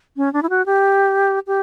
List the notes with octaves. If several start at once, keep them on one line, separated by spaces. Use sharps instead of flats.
C#4
D4
E4
F#4
G4
G4